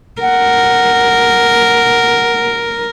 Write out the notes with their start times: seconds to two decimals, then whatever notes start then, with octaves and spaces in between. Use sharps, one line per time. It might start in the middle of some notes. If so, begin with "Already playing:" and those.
0.22 A#4 F#5